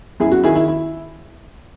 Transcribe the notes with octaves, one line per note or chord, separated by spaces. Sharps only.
F#2 E4 G#4
F#4
D#3 E4 G#4
E4
E4